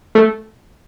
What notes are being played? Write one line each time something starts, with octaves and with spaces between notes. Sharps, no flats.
A3